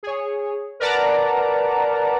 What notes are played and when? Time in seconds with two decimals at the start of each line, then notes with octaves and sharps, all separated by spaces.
0.03 G#4 C#5
0.80 A#4 B4 D5 F#5 A5 A#5